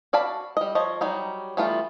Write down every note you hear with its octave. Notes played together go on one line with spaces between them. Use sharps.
F#4 D5 F5 A5 B5
G3 D#5
F3 C#5 D#5
F#3 G3 D#4
E3 G3 A3 B3 F4